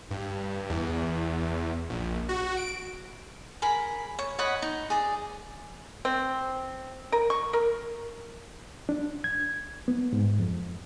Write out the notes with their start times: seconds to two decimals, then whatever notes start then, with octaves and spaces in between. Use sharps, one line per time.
0.11 G2
0.70 E2
1.90 A#1
2.29 F#4
2.57 D7
3.62 G#4 A#4 B5
4.19 C#5
4.39 C#5 D#5 F#5 B5
4.62 D#4
4.90 G#4 D5
6.05 C4
7.12 A#4
7.30 C#6
7.53 A#4
8.89 D4
9.24 G#6
9.88 B3
10.13 G#2
10.40 F2